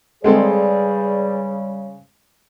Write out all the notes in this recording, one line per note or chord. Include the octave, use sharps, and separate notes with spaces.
C#3 G3 G#3 C4 G#4 A4 B4 D5